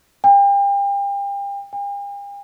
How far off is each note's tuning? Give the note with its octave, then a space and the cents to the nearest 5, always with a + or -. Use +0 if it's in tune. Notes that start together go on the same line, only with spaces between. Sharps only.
G5 +35
G5 +45